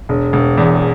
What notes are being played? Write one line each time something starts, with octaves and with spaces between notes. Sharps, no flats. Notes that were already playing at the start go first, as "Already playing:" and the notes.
E1
E1
E2